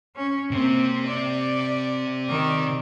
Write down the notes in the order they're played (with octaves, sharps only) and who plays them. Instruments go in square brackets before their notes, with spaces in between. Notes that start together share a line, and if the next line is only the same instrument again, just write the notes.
[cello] C#4
[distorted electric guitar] C3 [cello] A#3 C4
[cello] D5
D#3 D5